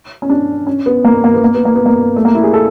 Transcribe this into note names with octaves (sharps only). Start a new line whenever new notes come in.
C#4
D4
C#4
B3
A#3
B3
A#3
B3
A#3
B3
A#3
B3
A#3
A3
A#3
E4
G#4
A4